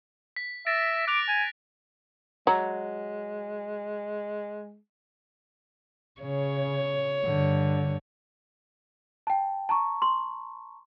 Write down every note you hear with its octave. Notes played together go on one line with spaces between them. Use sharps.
B6
E5 A6 A#6 D7
D6 F#6 D7 F7
G#5
F#3 G#3 A#5
C#3 C#5
G2 D3
G5 A5
A5 A#5 C#6
C6